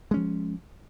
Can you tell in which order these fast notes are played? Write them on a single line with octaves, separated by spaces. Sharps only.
G#3 C#4 F3